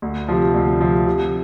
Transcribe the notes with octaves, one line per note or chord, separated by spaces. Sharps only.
D2
C3 F3
D2
C3 F3
C3